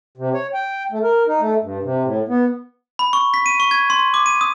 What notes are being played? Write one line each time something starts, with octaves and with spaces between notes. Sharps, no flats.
C3
C#5
G5
A3
A#4
D#4
A3
G2
C3
A2
B3
B5
C#6
B6
D#7
C#6
G#6
C6
D6
D#7
D#6